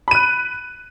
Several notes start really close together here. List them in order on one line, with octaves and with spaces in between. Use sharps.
B5 D#7 F#6